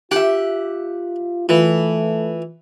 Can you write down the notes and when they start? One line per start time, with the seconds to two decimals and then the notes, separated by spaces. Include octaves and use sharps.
0.11 F4 G4 E5 F#5
1.49 E3 A3 F4 B4